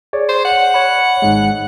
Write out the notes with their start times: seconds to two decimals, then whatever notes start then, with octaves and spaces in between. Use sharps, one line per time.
0.13 G#4 C#5 D5
0.29 C5
0.45 F#5
0.74 C#5 B5
1.22 G#1 G#2 G#3